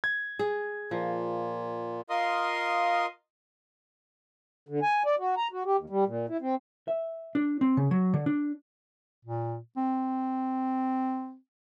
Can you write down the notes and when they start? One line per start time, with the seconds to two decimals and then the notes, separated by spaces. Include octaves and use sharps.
0.04 G#6
0.39 G#4
0.91 A#2 F3
2.10 F4 A#4 D#5 F5 C6 D#6
4.69 D3
4.82 G#5
5.06 D5
5.19 F#4
5.37 A#5
5.52 F#4
5.66 G4
5.78 D#2
5.90 G3
6.06 A#2
6.29 E4
6.41 C4
6.88 E5
7.35 D4
7.61 C4
7.77 C#3
7.91 F#3
8.14 D3
8.26 D4
9.25 A#2
9.77 C4